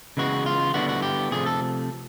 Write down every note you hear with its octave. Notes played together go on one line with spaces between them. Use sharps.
C#3 E3 G#3 B3 F#4
F4
D3 G3 B3 E4 F#4
F#4
G4
C3 F3 A3 G#4
A4